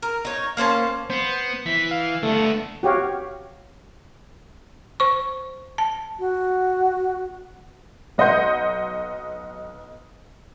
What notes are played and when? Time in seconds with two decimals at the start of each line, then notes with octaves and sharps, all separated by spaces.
0.02 A#4
0.25 D#4 C#5
0.57 A#3 C#4 C5 A5
1.10 B3 C5
1.66 E3 B6
1.91 F5
2.23 D3 A3 B3
2.83 F#4 G4 C#5 F5
5.00 C5 C#6
5.78 A5
6.19 F#4
8.18 B1 D#5 F#5 C6 G6